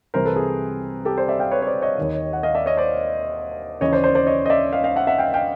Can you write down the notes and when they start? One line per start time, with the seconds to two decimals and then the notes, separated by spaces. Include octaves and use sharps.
0.14 C2 C3 E3 A#4 C5
0.25 A4 B4
0.36 G#4
1.05 G4 A4
1.18 C5 D5
1.28 D5 E5
1.40 F5 G5
1.51 B4 C#5
1.62 C#5
1.66 C5 D5
1.82 C#5 D#5
1.98 D#2 D#3
2.33 F#5
2.43 D#5 F5
2.55 D5 E5
2.66 C#5 D#5
2.77 C5 D5
3.81 D#2 C#3 E3 C#5 D#5
3.93 C5 D5
4.04 C5 D5
4.15 C5 D5
4.27 C#5 D#5
4.46 D#5
4.50 D5 E5
4.73 D#5 F5
4.84 D#5 F5
4.96 E5 F#5
5.07 E5 F#5
5.18 F5 G5
5.34 F5 G5